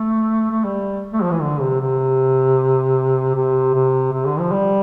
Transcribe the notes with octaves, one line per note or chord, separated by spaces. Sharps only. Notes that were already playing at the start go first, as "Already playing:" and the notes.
Already playing: A3
A3
G3
A3
F3
E3
D3
C3
C3
C3
C3
C3
D3
F3
G3